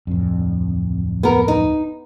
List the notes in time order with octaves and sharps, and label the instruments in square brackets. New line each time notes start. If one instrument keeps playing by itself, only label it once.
[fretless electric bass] D1 F2
[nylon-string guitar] B3 A#4
D#4